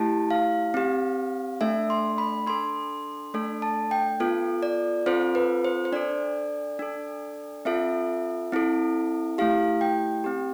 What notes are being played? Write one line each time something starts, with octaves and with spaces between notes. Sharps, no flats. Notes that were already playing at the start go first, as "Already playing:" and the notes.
Already playing: A3 E4 G4 A5
F5
C4 G4
A3 D4 A4 E5
C6
B5
D4 A4 C6
A3 D4 A4
A5
G5
B3 F4 A4
D5
C4 F4 A4 C5
B4
C5
C5
D4 A4 D5
D4 A4
C4 F4 A4 E5
C4 E4 A4
A3 E4 G4 F5
G5
C4 G4